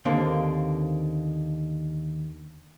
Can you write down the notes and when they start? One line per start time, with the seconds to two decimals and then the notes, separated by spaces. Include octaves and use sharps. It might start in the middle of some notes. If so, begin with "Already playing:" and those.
0.05 D#2 D3 A#3 C4